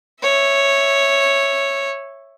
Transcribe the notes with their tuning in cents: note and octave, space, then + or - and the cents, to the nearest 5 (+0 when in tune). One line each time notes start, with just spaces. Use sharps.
C#5 -5 E5 +0